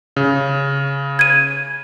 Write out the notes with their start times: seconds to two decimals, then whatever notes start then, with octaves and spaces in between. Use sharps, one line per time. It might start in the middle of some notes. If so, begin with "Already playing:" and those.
0.17 C#3
1.19 G#6 D#7